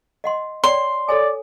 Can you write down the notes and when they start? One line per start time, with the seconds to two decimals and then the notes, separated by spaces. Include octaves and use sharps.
0.24 D#5 F#5 C6
0.64 C#5 D5 G5 C6
1.09 A4 C#5 D5 G#5